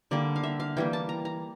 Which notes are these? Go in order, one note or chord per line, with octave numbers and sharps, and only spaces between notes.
D3 G3 A#3 D5
F5
E5
F5
E3 G3 A#3 G5
A5
A#5
A#5